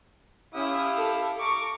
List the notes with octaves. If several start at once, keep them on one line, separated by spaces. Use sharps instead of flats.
C#4 E4 G4 F5 D#6
A4
A#5 C#6 D6